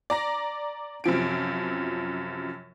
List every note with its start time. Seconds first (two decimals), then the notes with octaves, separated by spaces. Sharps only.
0.10 D5 A#5 A#6
1.04 F#2 C3 F3 D7